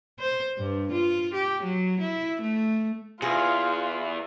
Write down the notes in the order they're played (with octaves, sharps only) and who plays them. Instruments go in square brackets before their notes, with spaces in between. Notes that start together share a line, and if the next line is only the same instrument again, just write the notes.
[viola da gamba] C5
G2
F4
G4
F#3
E4
A3
[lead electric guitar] E2 [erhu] F4 [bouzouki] G#4